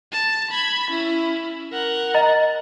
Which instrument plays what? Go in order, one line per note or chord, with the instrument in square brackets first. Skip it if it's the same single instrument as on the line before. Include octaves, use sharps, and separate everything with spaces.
[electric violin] A5
B5 G#6
C#4 E4
A#4 F#5
[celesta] D#5 A#5 A6